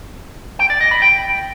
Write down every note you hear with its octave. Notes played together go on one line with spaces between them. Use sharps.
G5
D5
D#5
B5
G5